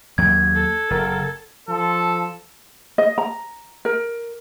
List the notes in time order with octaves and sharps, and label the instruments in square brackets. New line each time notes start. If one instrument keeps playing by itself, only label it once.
[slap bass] D#2 F#3 A#3 [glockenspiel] G#6
[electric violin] A4
[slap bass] F#1 [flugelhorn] A#4
[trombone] F3 [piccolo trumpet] A4
[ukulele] D#5
A#5
A#4